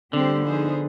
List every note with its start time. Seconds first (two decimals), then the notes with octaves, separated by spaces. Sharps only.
0.13 D3 G3 C4 G4 C5
0.44 F3 B3 D#4 G#4 C5